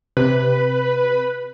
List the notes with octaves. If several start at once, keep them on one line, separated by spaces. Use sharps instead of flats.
C3 B4